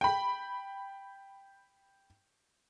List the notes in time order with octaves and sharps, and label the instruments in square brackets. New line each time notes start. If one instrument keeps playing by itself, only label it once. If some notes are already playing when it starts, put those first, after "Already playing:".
[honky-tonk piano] G5 B5